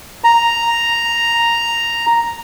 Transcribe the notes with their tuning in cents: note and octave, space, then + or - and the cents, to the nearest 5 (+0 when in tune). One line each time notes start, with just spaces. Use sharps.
A#5 +0